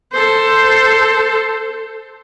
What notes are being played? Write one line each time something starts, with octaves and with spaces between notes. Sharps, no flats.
A4 C5